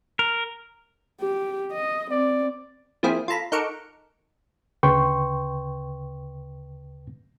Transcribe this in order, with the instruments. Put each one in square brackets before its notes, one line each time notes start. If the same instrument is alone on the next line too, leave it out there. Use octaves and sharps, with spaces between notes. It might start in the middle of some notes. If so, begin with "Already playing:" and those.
[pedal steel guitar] A#4
[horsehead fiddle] G4
D#5
[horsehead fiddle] C4 [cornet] D5
[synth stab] F3 A#3 C4 E4 G#4
F4 A4 A#5 B5
D#4 A4 A#4 F#5 C#6 D6
[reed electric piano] D2 C#3 B4 G5 C6 C#6